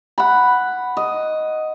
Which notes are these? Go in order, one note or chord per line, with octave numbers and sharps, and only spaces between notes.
F#5 B5
D#5